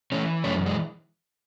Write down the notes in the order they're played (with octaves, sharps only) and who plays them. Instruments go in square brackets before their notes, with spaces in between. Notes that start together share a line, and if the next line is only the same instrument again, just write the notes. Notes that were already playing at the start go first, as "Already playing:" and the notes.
[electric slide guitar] E3 A3 C#4
F#2 A3 C#4
G#3